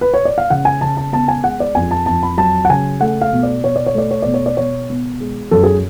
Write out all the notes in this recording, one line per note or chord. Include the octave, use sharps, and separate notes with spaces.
B4
C#5
D5
F5
C#3 F#5
G#5
C#3 A5
A5
B3 A5
G#5
G#3 F#5
D5
F2 G#5
A5
F2 A5
B5
F#3 A5
F#5
C#3 G#5
A3 F#5
F5
B2
D5
B2 C#5
D5
C#5
A3 D5
C#5
B2 D5
C#5
D5
B2 C#5
B3
G#3
F#2 A4
G#4